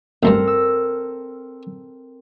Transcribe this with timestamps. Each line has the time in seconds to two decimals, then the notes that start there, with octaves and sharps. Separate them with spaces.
0.23 A1 D2 G2 C4 A4 A#4
0.47 E6